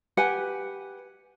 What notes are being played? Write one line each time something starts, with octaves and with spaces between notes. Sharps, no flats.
G4 B4 F#5 G#5